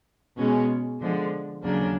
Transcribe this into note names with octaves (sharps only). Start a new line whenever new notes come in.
B2 G#3 C#4
D3 F3 G#3
D#2 C#3 F#3 A#3 D4